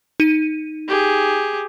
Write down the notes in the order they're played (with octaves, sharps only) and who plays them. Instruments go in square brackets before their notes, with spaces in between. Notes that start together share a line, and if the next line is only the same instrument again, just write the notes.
[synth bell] D#4 D#7
[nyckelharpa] G4 G#4